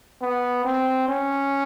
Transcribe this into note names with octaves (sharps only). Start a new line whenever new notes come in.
B3
C4
C#4